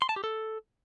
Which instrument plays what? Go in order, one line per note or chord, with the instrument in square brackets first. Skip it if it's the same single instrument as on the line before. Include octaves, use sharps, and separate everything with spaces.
[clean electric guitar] C6
A5
G4
A4